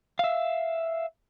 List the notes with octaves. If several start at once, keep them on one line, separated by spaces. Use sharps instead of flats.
E5 F5